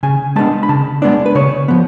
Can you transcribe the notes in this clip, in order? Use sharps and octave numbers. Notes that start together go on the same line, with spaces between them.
C#3 G#5
G#3 B3 D4 A5
B5
C#3 A5
G#3 B3 D4 D5
B4
C#3 C#5
F3 B3